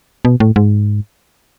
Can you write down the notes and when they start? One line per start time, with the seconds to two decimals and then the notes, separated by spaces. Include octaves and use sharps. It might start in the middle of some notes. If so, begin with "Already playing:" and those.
0.25 B2
0.40 A2
0.56 G#2